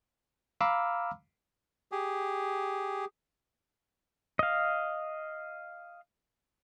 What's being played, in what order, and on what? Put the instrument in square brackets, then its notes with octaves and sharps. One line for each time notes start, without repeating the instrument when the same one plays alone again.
[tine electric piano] F5 A#5 B5 D6 E6 F6
[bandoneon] G4 G#4
[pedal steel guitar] D#5 F5